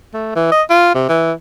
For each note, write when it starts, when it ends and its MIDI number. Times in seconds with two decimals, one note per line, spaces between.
0.14 0.36 57
0.36 0.47 52
0.52 0.63 75
0.70 0.93 65
0.95 1.07 48
1.09 1.32 52